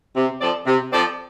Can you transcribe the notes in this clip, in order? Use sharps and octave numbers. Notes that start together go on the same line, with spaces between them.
C3
F3 C4 A4 D5
C3
F3 C4 A4 D5